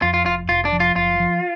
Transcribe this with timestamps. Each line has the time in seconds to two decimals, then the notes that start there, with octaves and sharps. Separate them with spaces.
0.02 F2 F4
0.14 F4
0.26 F1 F4
0.49 F1 F4
0.65 D4
0.72 F3
0.80 F4
0.96 F#1 F4
1.19 F3